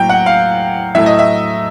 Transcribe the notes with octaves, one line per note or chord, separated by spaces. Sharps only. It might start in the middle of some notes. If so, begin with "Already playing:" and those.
Already playing: A2 F#3 A#3 G5
F#5
F5
A2 F#3 A3 E5
D#5
E5